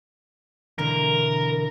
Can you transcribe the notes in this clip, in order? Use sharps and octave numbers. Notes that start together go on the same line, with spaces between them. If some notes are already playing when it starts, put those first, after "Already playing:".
B2 D3 E3 A#4